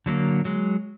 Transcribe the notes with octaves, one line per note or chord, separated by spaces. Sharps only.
D3 F#3 G#3 A#3
F#3 G#3